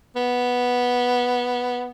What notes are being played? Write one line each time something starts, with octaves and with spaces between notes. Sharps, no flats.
B3